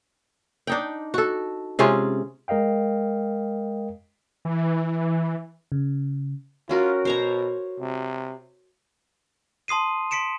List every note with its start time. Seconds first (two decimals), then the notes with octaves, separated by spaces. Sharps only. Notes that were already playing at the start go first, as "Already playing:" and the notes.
0.67 D4 D#4 G5
1.14 F#4 A4
1.79 C3 G#3 C#4 F4
2.48 G#3 A#4 D#5 F5 G5
4.45 E3
5.72 C#3
6.69 C#4 F4 F#4 A#4
7.05 B2 C5 C#5 A#5
7.80 C3
9.68 A5 C6 D#6 C7 D#7
10.11 C6 B6 C#7 D7 E7